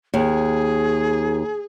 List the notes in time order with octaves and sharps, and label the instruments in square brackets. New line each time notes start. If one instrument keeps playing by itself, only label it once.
[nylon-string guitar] D#2 [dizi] G#4